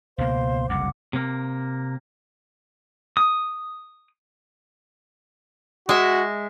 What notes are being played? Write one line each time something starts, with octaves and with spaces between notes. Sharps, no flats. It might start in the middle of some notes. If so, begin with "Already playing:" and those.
C#2 B2 A#3 C5 F5 C6
F#1 C2 F2 F#5 D6
C3 A#3
D#6
G#3 F#4 E5